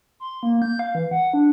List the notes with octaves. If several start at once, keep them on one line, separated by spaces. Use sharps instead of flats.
C6
A#3
G6
F5
E3
F#5
D4